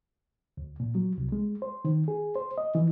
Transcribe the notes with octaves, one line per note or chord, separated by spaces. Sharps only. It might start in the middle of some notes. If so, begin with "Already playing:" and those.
D2
A#2
F#3
C2
G#3
C5
D#3
G#4
C5
D#5
E3